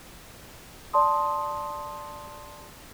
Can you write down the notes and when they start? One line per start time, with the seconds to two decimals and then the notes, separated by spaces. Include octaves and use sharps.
0.93 D5 A5 C6 D#6